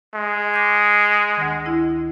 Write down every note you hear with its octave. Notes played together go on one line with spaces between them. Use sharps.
G#3
D6 G6
D2 D#3
E4